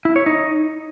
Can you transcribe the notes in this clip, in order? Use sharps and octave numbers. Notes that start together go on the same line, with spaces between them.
E4
C#5
D#4